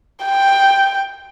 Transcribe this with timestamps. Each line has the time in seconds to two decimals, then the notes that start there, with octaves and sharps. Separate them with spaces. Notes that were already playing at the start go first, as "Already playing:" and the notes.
0.25 G5